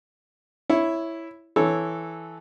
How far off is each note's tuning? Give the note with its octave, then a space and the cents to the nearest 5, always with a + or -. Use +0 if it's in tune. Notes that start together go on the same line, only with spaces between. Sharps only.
E4 +0 C#5 +0
E3 +0 A4 -15 C#5 -10